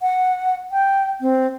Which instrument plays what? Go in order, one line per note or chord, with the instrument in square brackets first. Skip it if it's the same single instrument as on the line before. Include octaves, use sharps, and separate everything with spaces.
[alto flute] F#5
G5
C4